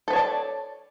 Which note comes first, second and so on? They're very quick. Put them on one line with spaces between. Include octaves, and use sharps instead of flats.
A4 B4 C#5 A5 D5